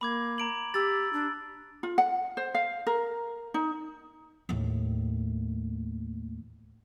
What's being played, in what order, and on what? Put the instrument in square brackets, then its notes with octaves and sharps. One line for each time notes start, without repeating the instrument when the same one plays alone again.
[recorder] A#3 [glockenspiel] B5 D6 G#6
[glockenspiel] A#5 D7 F#7
[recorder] G4 [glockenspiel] E6 A6
[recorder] D4
[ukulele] F4
F#5
C5
F5
A#4
D#4
[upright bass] D#2 A2